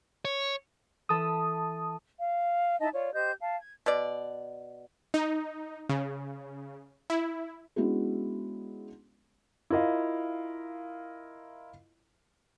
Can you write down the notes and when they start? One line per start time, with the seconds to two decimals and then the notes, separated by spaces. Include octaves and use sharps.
0.25 C#5
1.09 E3 A4 A5 B5 D#6
2.19 F5
2.80 D#4 E4 D#5 A5
2.93 F4 C#5 D5
3.14 G4 C5 D#5 G6
3.40 F5 A5
3.58 G#6
3.86 B2 D5
5.14 D#4
5.89 C#3
7.10 E4
7.76 G#3 B3 C#4 D4 E4 F#4
9.70 E4 F4 A#4 D#5 F5